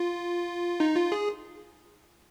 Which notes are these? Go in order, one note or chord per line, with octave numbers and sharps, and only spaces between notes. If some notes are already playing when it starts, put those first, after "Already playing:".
Already playing: F4
D#4
F4
G#4